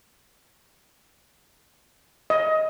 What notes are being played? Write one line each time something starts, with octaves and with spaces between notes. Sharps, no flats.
D#5